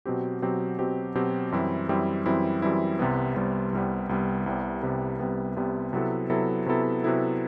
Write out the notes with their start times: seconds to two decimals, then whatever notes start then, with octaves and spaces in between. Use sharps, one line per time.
0.05 B2 F#3 C4 G4
0.42 B2 F#3 C4 G4
0.79 B2 F#3 C4 G4
1.15 B2 F#3 C4 G4
1.52 F#2 E3 G3 C4 E4
1.89 F#2 E3 G3 C4 E4
2.26 F#2 E3 G3 C4 E4
2.62 F#2 E3 G3 C4 E4
2.99 C2 C3 G3 B3
3.36 C2 C3 G3 B3
3.73 C2 C3 G3 B3
4.09 C2 C3 G3 B3
4.46 C2 C3 G3 B3
4.83 C2 C3 G3 B3
5.20 C2 C3 G3 B3
5.56 C2 C3 G3 B3
5.93 C3 F#3 B3 E4 A4
6.30 C3 F#3 B3 E4 A4
6.66 C3 F#3 B3 E4 A4
7.03 C3 F#3 B3 E4 A4